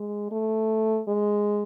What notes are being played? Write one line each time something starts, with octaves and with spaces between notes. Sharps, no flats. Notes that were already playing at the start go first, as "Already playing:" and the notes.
Already playing: G#3
A3
G#3